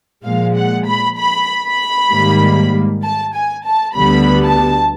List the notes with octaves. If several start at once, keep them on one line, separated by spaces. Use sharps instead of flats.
A#2 F3 G#3 F5
F#5
B5
B5
B5
G#2 D#3 G3 A#3
A5
G#5
A5
D2 D3 G3 B3 B5
A5